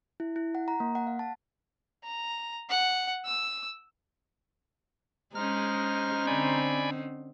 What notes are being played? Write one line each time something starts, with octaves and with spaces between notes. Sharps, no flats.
E4
E4
F#5
A#5
A#3
F#5
F5
A5
A#5
F#5
E6
G#3 C#4 D#4 C5 A#5 F6
D3 C4 D5 G#5 B5